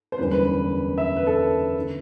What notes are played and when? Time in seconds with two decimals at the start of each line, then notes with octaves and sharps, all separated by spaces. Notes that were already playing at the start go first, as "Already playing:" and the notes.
0.12 C5
0.18 F#1 E2 D3 G3 B4
0.31 B4
0.45 B4
0.98 E5
1.17 B4
1.27 A4
1.80 D3